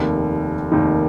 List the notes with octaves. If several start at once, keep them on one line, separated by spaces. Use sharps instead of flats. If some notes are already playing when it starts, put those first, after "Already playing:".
Already playing: F1 D#2 D#3
F1 D#2 D#3